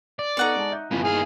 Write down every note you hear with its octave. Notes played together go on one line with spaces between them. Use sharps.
D5
B3 D#4 A4 F#5 C#6
G#3 A5
E5 G6
G1 E3 F3 B3
D#2 G#4 F5